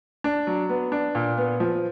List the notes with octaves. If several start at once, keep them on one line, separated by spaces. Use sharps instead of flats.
D4
F#3
B3
D4
A#2
B3
F3